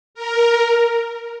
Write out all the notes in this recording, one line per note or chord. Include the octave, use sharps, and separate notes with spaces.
A#4